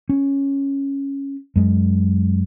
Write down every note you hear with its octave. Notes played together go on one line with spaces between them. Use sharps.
C#4
F#2 G#3